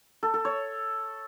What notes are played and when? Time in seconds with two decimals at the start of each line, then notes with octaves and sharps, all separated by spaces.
0.23 A4
0.34 A4
0.45 C#5